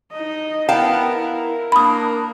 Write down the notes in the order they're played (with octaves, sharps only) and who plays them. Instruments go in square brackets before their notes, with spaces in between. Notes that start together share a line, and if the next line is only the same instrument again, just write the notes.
[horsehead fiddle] D#4 D#5
[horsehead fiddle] B3 E4 [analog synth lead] A#4 [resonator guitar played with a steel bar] F5 G5 A5
[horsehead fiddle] E4
[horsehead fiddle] A#3 D4 [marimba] B5 D#6